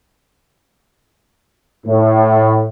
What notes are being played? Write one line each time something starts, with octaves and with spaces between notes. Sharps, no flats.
A2